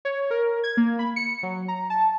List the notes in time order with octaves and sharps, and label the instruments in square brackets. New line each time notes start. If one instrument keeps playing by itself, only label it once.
[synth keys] C#5
A#4
G#6
A#3
B5
C#7
F#3
A#5
A5